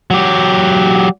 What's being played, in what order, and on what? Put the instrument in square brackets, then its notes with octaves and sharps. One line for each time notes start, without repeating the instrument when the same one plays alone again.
[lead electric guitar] F#3 G4